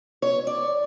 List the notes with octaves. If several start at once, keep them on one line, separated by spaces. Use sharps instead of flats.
C#5
D5